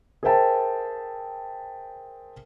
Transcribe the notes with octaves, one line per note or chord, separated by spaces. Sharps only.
G#4 A#4 C5 E5 G5 A5